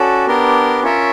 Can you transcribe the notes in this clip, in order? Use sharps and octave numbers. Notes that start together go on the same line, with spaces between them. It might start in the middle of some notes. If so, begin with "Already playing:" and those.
Already playing: C#4 F#4 A4 D5
B3 D4 G4 A#4
C#4 F4 A#4 C#5 E5